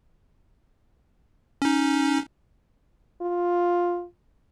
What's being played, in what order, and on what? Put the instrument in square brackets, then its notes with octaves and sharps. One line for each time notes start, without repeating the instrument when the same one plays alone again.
[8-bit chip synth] C#4 D#4
[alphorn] F4